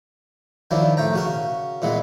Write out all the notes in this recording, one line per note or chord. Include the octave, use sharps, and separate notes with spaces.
D#3 F3 F#3 D4 E4
A2 A3 G5 A#5
C#3 F#4 A#4
A#2 E3 G#3 B3